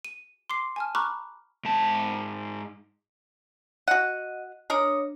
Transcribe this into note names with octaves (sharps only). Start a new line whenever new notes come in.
D#7
C6 D6 C7
G#5 A5 F6
A#5 B5 C#6 D6 F6 F#6
G#2 A5
F#4 D#5 F#5
D4 A#4 C#5 D#5